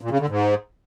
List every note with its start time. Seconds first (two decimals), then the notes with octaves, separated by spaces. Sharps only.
0.01 A#2
0.11 C#3
0.20 D3
0.29 G#2